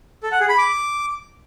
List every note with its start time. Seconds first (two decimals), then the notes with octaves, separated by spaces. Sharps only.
0.23 A4
0.32 F#5
0.40 G#4
0.49 B5
0.58 D6